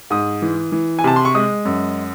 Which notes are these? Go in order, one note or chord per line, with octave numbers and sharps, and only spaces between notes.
G#2 D#6
E3
E3
G#5
C3 A5
C6
C#6
G#3 D#6
F#2